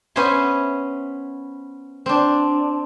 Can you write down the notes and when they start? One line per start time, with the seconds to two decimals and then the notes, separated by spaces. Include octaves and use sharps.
0.16 B3 C#4 C5 E5 G#5 C6
2.06 C4 D4